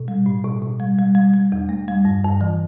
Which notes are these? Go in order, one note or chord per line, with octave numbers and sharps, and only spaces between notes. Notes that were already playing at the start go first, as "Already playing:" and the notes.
Already playing: B2
G3
A2
B2
B2
G3
G3
G3
G3
E2
A3
G3
G2
G2
E3